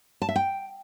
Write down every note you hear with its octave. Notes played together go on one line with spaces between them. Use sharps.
A5
E5
G5